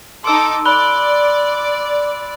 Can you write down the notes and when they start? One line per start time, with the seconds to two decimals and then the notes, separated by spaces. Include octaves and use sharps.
0.24 D#4 A4 C6 D6 E6
0.65 D5 B5 F#6 G7